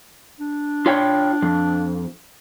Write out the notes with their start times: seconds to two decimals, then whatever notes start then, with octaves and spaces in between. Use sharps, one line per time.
0.40 D4
0.86 F4 C#5 G5
1.42 F2